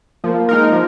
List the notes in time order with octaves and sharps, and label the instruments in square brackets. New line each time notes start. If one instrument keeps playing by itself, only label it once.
[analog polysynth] F3 [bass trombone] A#3
[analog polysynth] G#3 D#4 A#4
F3